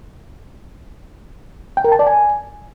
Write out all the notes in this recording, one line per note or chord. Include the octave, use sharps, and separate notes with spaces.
G5
A#4
A5
D5
G#5